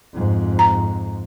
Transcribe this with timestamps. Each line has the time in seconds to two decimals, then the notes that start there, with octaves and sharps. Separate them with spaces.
0.13 F2 G#2
0.59 A#5